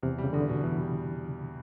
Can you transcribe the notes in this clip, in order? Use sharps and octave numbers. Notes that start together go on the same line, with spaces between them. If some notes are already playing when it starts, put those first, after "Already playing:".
E2 C3
G3
C#3
E2 D3
B2
E2 E3
G3